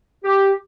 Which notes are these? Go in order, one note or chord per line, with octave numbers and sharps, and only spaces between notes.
G4